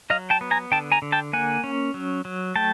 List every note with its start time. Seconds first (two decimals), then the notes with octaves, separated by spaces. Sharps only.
0.10 F#3 D#5 F5
0.30 G5 A5
0.41 B3
0.51 G#5 A#5
0.72 D3 G5 A5
0.92 G#5 A#5
1.02 D3
1.12 G5 A5
1.33 A#3 F#5 G#5
1.64 C#4
1.94 F#3
2.25 F#3
2.56 A3 G5 A5